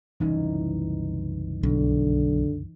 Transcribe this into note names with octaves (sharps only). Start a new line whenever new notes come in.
F#1 C2 E3 C#4 D#4
B1 D3